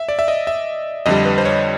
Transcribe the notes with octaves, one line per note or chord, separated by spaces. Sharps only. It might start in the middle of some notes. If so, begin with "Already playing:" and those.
Already playing: E5
D5
E5
D#5
E5
F2 D3 G3 D#5
B4
C5
C#5